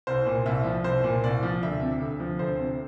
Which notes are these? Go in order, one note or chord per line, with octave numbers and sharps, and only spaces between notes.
C2 C5
A#2
C2 E5
F3
C2 C5
A#2
C2 D5
F3
D2 E5
C3
D2
F3
D2 C5
C3